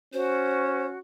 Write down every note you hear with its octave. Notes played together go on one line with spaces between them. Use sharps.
C#4 F#4 C5